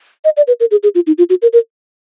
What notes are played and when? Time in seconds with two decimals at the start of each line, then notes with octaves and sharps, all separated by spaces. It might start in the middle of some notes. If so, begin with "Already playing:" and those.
0.25 D#5
0.37 D5
0.47 B4
0.60 A#4
0.71 G#4
0.83 G#4
0.95 F4
1.07 D#4
1.18 F4
1.30 F#4
1.42 A#4
1.53 A#4